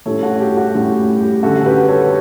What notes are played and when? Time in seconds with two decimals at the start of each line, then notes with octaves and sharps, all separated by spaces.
0.06 A2 G3 C#4 A4 C#5
0.23 F#4 A4
0.40 G4
0.57 F#4
0.74 A2 G3 C#4 G4
1.20 G4
1.43 D3 G3 C#4 F#4 A4
1.66 G4 B4
1.88 A4 C#5